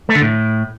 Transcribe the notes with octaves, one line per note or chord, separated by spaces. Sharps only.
A3
D3
A2